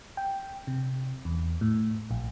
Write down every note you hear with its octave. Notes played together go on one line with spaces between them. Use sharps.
G5
C3
E2
A2
A#1